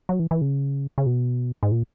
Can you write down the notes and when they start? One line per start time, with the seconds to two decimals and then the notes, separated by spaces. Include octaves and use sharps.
0.09 F#3
0.19 E3
0.31 E3
0.41 C#3
0.98 C#3
1.06 B2
1.63 G#2
1.72 A#2